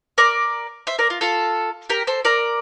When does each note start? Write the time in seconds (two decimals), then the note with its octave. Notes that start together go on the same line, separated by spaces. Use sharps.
0.18 A#4 D5
0.87 C5 E5
0.99 A#4 D5
1.10 F4
1.21 F4 A4
1.90 G4 A#4
2.07 A4 C5
2.25 A#4 D5